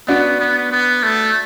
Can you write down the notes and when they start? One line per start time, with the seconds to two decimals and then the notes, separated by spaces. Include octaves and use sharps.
0.08 B3 D4 F#4
0.40 B3
0.71 B3
1.03 A3